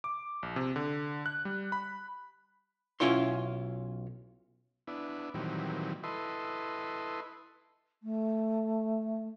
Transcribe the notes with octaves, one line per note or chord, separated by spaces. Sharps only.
D6
A#1
C3
D3
F#6
G3
B5
B1 C#4 E4 F4 C#5 C6
B3 D4 E4
A#2 D#3 E3 F#3 G3 C4
E4 A4 B4 D#5 C6
A3